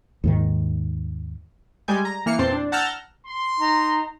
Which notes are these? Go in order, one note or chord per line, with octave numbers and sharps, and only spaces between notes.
D#2 G#2 D#3
G3 G#3 G#5 G6
A#5
E3 A#3 F6 C7 C#7
E2 A#2 C4 C5 A5 C6
D4
F#5 A5 A#5 E6 F6 G6
C6
D#4 A#5